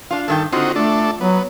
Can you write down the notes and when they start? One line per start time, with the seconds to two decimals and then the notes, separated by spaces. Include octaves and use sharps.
0.11 D4 F4 F5
0.28 G2 D#3 A4 G5
0.52 D3 C4 D#4 F4 F#4
0.76 A3 D4 A4
1.21 F#3 B3